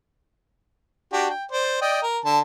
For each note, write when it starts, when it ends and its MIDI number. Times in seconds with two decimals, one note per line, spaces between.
1.13 1.29 62
1.13 1.29 66
1.13 1.29 67
1.30 1.45 79
1.51 1.77 72
1.51 1.77 74
1.81 2.01 74
1.81 2.01 75
1.81 2.01 79
2.03 2.19 70
2.25 2.40 50
2.25 2.40 81